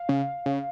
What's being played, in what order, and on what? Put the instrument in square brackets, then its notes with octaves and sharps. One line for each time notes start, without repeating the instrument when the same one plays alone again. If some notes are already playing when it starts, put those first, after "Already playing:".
Already playing: [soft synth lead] F5
[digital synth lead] C#3
C#3